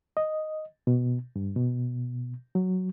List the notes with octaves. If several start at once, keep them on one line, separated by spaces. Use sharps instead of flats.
D#5
B2
G2
B2
F#3